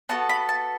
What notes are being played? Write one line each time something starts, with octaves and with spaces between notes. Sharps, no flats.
B3 F#4 A4 A5
B5
A5